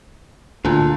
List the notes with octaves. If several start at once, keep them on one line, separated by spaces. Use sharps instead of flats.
D2 A#2 D3